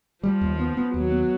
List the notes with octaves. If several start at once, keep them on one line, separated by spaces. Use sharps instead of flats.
F3 G3
D#2
B3
B3
D#2 F#3
B3